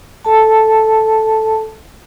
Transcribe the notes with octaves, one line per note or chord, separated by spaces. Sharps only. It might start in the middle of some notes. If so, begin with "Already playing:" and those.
A4 A5